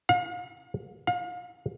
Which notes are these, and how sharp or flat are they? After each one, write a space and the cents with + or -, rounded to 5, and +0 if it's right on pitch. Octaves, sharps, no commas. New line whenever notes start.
F5 +40
F5 +35